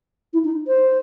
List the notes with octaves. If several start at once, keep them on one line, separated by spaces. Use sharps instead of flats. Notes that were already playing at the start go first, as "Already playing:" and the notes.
E4
D#4
C5